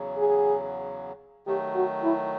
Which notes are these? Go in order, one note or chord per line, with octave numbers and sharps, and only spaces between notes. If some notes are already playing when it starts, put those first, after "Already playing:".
Already playing: E2 C#3 F#3
G#4
D#3 F#3 A3 G4
F#4
E4